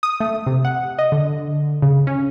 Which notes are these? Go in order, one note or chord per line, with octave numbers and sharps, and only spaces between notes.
D#6
A3
C3
F#5
D#5
D3
C#3
C#4